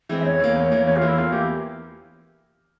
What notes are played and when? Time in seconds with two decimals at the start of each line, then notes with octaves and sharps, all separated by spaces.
0.09 E3 G#3 C4
0.20 E5
0.25 E2 C#5
0.40 E3 A#3
0.55 E2 C#5
0.72 E3 A#3
0.87 E2 C#5
0.97 F4
1.01 E3 A#3
1.08 E4
1.18 E2 F4
1.32 E3 A#3 G4